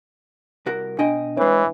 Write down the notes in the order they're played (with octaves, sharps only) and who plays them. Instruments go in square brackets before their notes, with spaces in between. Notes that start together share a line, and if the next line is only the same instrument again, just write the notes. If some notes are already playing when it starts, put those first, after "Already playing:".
[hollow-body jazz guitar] C2 F#4 A#4
[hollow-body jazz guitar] B2 D#5 G5 [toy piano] D4
[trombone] E3 [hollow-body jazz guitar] G#3 C4 [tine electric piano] B4 C#5